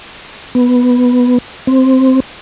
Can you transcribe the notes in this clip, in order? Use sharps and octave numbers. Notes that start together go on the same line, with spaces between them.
B3
C4